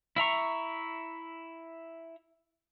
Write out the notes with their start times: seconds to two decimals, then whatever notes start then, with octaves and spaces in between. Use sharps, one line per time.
0.16 E4 E5 A#5 C#6